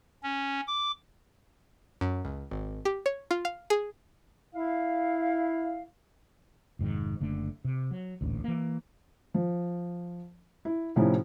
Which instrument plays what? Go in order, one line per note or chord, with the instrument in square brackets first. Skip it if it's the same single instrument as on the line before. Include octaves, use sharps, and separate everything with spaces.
[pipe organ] C#4
D6
[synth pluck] F#2
C#2
G#1
G4
C#5
F4
F5
G#4
[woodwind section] E4 F5
[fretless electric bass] F1 G#2 B2 D#3
F#1 D3 A3
C3
F#3
D#1 A1 D2
E3 A#3
[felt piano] F3
E4
A2 C3 F3 C#4 D#4 E4